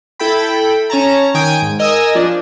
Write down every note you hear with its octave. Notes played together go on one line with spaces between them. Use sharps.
E4 A4 G5 B5
C#4 C#5 A5 A#5
D#3 G5 G#5 D#6 G#6 D7
G#2
A#4 D#5 G#5 D#6 E6
F3 D4